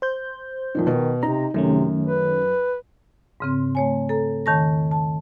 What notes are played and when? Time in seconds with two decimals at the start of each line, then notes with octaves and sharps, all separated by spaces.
0.02 C5 G6
0.75 F2 A#2 D#3
0.87 B2 D#3
1.23 C3 D#4 A#5
1.54 F#2 C3 D#3 A3 C#4
2.07 B4
3.40 G#2 C#3 C4
3.75 A3 C#5 G#5
4.09 A4 A#5
4.46 E2 D#3 C#5 A5 C#6 A#6
4.91 A5